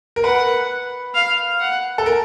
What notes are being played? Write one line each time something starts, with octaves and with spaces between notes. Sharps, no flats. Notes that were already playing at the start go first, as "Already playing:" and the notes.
A#4
B4 F#5
F5
F#5
A4
A#4